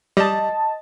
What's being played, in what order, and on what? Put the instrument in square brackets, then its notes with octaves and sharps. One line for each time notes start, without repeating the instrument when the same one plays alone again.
[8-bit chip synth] G3 [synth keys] D#5 A5